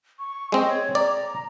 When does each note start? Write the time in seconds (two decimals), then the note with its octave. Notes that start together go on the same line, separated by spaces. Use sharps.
0.19 C#6
0.52 G#3 C4 D#5
0.68 C#5
0.95 D5 A#5